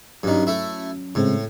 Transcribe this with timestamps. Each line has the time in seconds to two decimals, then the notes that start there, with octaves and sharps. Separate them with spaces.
0.23 G2 D#3 F#3 C#4
0.47 A3 E4
1.15 A2 C#3 G#3 C4